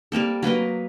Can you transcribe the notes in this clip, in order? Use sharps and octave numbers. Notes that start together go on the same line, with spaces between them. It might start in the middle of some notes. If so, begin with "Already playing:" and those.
G3 A#3 C4 A4
F#3 A#3 B4 D#5